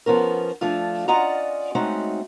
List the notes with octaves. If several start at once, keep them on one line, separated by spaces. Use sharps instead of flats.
F3 B3 C#4 A#4
F3 A3 D4 F4
C#4 F4 D5 D#5 F#5 A#5
G#3 A3 C4 C#4 D#4 F#4